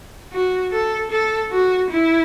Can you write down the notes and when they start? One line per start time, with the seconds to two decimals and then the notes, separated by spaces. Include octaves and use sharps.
0.33 F#4
0.72 A4
1.11 A4
1.52 F#4
1.90 E4